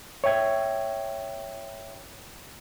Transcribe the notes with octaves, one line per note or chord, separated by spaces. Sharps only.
C#5 E5 G5 G#6